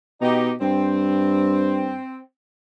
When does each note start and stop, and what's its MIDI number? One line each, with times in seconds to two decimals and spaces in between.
0.21 0.55 47
0.21 0.50 63
0.21 0.50 67
0.61 1.99 43
0.61 2.18 60